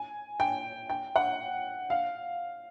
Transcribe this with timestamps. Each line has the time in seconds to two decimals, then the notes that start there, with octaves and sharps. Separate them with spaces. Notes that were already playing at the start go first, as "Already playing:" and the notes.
Already playing: G#5
0.40 G5
0.90 G5
1.16 F#5
1.90 F5